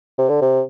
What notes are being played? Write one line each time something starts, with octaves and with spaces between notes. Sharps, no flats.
C3
D3
C3